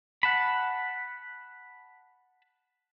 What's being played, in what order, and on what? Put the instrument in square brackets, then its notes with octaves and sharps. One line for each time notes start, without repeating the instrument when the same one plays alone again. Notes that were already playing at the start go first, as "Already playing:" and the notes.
[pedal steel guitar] F#5 A5 B5